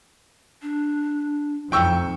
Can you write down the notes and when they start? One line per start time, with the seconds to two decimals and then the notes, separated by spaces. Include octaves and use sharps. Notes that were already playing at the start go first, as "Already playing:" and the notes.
0.62 D4
1.72 F2 D#4 G5 C#6 E6